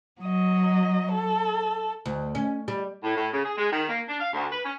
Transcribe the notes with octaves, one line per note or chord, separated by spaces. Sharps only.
F#3 D#5
A4
D2
C#4
G3
A2
A2
C#3
G#4
G#3
D#3
A#3
D4
F5
D2
B4
C#4